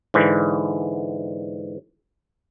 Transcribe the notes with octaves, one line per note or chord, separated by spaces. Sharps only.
G#2 D3 E3